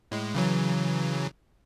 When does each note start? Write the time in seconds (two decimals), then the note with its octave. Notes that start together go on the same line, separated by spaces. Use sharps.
0.11 A2 G#3
0.34 C#3 E3 F#3